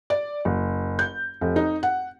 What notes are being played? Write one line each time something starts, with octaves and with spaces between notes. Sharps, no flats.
D5
F#1
G6
F1
D#4
F#5